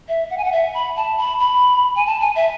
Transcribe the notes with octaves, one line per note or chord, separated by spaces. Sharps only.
E5
F#5
G#5
F#5
E5
B5
A5
B5
B5
G#5
A5
G#5
E5